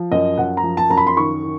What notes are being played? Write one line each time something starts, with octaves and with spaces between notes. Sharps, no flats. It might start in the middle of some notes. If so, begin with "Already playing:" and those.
Already playing: F3
F#2 D#5
F#2 F#5
A#5
F3
A5
F#2 A#5
B5
C6
D#3 C#6
D#3